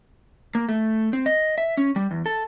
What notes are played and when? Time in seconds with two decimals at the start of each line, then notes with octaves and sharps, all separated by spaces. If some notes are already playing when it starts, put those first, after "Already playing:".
0.55 A#3
0.69 A3
1.13 C4
1.26 D#5
1.58 E5
1.77 C#4
1.96 G3
2.11 E2
2.26 A4